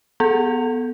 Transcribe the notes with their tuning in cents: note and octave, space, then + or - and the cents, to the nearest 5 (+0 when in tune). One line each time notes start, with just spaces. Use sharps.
B3 +0 A4 +0